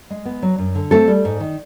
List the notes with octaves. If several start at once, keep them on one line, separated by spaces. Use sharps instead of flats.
G#3
B3
F#3
F#2
D3
A3 C4 A4
G3
G#2
D#3